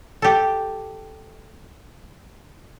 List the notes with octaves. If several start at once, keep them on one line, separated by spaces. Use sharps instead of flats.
G4 A4